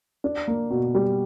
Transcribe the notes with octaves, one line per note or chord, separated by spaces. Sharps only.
D4
A#3
B2
G3